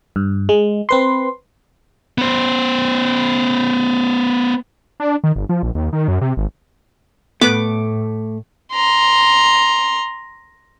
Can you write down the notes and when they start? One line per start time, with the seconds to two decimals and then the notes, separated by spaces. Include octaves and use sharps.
0.16 G2
0.49 G#3
0.89 C4 B4 C6
2.18 B3 C5
5.00 D4
5.24 D#3
5.36 G1
5.49 F3
5.63 A#1
5.75 D#2
5.93 D#3
6.08 F#2
6.21 C3
6.37 G#1
7.41 A2 A3 B3 B4 D6
8.74 A#5 C6